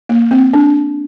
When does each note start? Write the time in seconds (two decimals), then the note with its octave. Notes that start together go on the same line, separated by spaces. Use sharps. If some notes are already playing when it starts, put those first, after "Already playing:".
0.09 A#3
0.31 C4
0.53 D4